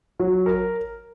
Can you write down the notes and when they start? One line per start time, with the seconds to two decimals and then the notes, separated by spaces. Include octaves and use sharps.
0.19 F#3
0.46 A#4